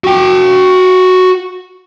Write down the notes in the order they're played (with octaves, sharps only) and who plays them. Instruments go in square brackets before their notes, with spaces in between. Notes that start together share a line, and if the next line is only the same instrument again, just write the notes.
[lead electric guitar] F#4 G5